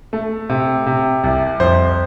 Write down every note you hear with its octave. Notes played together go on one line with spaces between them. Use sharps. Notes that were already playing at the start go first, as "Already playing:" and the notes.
A3
C3
C3
C2
F2 C5